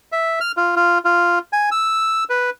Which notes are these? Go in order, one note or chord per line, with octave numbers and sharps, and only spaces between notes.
E5
F6
F4
F4
F4
G#5
E6
B4